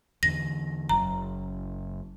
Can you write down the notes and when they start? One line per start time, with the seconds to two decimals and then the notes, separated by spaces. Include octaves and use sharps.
0.23 E2 D3 A#6
0.89 F#1 F#2 A#5